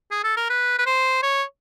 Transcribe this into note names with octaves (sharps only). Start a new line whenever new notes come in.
G#4
A4
A#4
B4
B4
C5
C#5